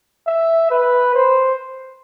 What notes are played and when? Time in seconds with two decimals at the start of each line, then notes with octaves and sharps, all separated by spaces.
0.27 E5
0.71 B4
1.14 C5